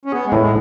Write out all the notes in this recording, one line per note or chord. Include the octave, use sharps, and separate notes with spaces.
C#4
B3 G#4
G#3
A2
G#3